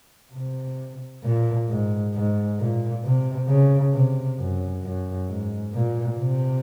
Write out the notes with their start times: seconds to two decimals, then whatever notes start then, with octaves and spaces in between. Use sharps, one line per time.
0.33 C3
1.24 A#2
1.68 G#2
2.14 G#2
2.59 A#2
3.04 C3
3.48 C#3
3.93 C3
4.38 F#2
4.83 F#2
5.28 G#2
5.73 A#2
6.19 C3